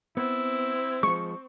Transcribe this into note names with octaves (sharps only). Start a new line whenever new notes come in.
B3 C4 E4
F3 G#3 C#6